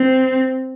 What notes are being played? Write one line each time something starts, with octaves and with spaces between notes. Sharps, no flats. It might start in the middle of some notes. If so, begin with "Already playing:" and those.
Already playing: C4